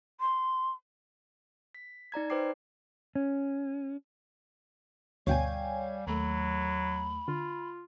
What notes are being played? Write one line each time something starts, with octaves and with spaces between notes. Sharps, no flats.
C6
B6
D#4 D5 A#5 G#6
D#4 B4 C5 G5 D6 C7
C#4
D2 G2 B2 G3 C#5 F5 G5 G#5
D#2 F#3 A3 B5
D3 F4